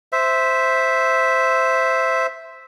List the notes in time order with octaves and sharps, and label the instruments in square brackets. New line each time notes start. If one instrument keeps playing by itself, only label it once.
[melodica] C5 E5